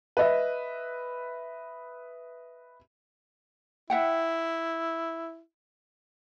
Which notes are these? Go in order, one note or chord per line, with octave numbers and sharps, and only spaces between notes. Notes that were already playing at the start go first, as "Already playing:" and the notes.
B4 D#5 E5
E4 E5 F#5 G5